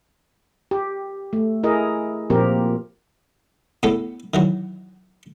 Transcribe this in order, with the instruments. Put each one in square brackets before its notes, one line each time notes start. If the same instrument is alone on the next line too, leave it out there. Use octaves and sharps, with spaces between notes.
[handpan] G4
A3
E4 G#4 A#4 D#5
A#2 F3 A#3 C4 G4 A#4
[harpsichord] A2 B3 A4
D#3 E3 F#3